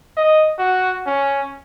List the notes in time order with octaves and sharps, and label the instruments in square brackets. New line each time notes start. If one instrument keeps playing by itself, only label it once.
[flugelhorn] D#5
F#4
C#4